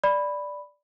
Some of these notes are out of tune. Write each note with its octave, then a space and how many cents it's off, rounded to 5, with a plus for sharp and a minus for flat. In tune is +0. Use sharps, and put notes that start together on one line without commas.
D5 +0 B5 +0